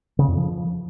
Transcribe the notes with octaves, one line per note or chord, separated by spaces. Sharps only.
C#3
F2
F3